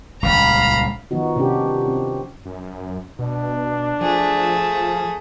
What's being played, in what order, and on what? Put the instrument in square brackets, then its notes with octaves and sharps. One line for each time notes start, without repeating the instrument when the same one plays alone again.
[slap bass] D#1 G#1 C#2 [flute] F5 [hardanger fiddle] A#5 B5
[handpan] D#3 F3 B3 D#4 F#4
C3 C#4 D4 F#4 G4
C4
[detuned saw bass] F#2
[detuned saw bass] B2 [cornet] D4
[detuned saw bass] F3 [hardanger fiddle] A3 G#4